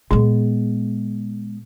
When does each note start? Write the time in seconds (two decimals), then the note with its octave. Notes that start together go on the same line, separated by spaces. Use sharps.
0.11 A#2 G#3 B3